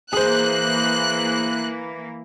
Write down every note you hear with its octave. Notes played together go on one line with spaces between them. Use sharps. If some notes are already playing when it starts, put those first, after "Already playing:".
E3 A#3 G#4 C5 F#6